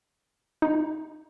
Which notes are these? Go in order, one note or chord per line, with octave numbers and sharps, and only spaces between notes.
D#4